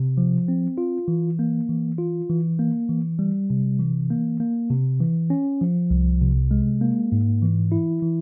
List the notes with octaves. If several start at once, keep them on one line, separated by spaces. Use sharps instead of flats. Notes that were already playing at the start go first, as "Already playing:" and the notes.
Already playing: C3
F3
C4
F4
E3
A#3
E3
F4
E3
A#3
E3
G3
C3
E3
A#3
A#3
C3
E3
C#4
F3
C2
C3
G#3
A#3
G#2
E3
E4
E3